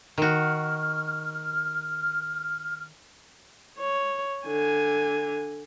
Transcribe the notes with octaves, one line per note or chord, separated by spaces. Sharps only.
D#3 F#4 F6
C#5
D3 G#5